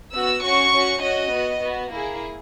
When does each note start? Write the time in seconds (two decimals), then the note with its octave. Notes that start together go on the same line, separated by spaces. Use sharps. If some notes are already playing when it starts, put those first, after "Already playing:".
0.13 B3 F#4 E6
0.43 C#4 F#4 C#6
0.73 C#4 F#4
1.02 C#4 F#4 D#5
1.32 B3 F#4
1.61 B3 F#4
1.91 A#3 E4 G#4